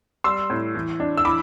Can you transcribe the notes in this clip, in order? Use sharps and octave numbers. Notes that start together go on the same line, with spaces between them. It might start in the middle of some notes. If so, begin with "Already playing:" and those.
G3 C6 E6
A2
E3
D4
E6
E3 B5 D6